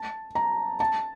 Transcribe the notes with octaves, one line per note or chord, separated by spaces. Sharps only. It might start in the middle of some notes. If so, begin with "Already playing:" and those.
Already playing: A5
A#5
A5